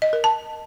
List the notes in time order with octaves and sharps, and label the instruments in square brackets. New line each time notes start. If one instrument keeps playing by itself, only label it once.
[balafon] D#5
A#4
A5